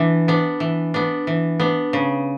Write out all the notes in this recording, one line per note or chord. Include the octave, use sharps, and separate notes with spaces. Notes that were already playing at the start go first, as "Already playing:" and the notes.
Already playing: E3 B3 D4
B3 D4
E3
B3 D4
E3
B3 D4
C#3